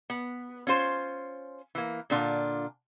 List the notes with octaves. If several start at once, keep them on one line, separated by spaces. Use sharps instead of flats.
B3
C#4 F4 C5
E3 A#3
A#2 D3 D4 F4